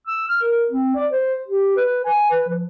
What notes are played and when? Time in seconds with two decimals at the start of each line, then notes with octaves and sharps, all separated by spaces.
0.07 E6
0.29 F6
0.42 A#4
0.71 C4
0.96 D5
1.11 C5
1.48 G4
1.77 B4
2.05 G#5
2.30 B4
2.49 F3